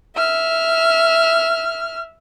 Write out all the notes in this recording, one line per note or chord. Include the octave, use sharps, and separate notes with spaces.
E5 F6